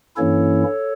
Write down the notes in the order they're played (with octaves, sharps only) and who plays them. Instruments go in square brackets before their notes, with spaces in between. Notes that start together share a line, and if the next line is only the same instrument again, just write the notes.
[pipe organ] G2 E3 A#3 C#4 E4 A4 C#5